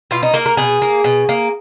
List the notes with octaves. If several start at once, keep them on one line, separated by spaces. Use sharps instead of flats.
B2 F4
D#4
A#3 A#4
A#4
B2 G#4
A#3
B2
A#3